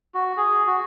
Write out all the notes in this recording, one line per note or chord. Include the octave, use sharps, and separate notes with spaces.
F#4
G#4
F#4